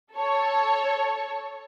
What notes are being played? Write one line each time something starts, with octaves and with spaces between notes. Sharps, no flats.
A4 C#5